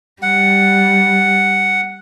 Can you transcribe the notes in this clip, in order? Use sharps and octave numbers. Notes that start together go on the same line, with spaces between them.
G3 F#5